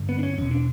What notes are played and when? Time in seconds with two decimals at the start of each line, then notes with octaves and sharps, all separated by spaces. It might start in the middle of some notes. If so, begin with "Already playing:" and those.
Already playing: G2 D3
0.09 B3
0.19 D4
0.23 C#4
0.38 E2 B2 C#4
0.51 D4